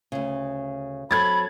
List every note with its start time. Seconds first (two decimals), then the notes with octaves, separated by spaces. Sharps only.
0.12 D2 C#3
1.11 F#3 C4 A4 B5 G#6 A6